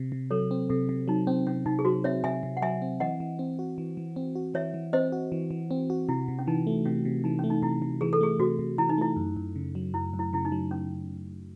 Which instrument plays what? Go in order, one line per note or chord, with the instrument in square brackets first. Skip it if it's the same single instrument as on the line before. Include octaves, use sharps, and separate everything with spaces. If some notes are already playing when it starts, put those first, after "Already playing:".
Already playing: [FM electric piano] C3
C3
[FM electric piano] F#3 [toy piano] A4 C#5
[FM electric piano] C4
[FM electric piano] C3 [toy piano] A4
[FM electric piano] C3
[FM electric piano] F#3 [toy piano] D#4
[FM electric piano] C4 [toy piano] C#4
[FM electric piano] C3 [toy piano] C#4
[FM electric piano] C3 [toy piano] D#4
[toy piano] G#4
[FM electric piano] F#3 [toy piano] F#4
[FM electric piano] C4 [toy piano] C#5 E5
[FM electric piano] C3 [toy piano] E5 G#5
[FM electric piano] C3
[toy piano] F#5
[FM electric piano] F#3 [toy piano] E5 G#5
[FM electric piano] C4
[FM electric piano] E3 [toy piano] D#5 F#5
[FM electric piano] E3
C4
F#4
E3
E3
C4
F#4
[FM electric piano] E3 [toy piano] C#5 E5
[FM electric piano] E3
[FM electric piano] C4 [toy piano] C5 D#5
[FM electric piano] F#4
E3
E3
C4
F#4
[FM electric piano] C3 [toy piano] E4
[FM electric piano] C3
[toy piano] C#4
[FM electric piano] E3 [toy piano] D#4
[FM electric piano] A3
[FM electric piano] C3 [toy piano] C#4
[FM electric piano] C3
[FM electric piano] E3 [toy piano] D#4
[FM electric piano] A3 [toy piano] C#4
[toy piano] D#4
[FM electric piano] C3 [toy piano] E4
[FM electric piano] C3
[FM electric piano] E3 [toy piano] G#4
[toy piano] A4
[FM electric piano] A3 [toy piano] G#4
[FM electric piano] C3 [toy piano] F#4
[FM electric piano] C3
[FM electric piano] E3 [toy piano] E4
[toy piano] D#4
[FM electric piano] A3 [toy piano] E4
[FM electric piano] F#2
F#2
C#3
F#3
[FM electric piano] F#2 [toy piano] E4
[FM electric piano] F#2
[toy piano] E4
[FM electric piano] C#3 [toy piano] E4
[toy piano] D#4
[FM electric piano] F#3
[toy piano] C#4